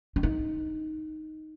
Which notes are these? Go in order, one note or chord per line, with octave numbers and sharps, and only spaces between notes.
D4
D#4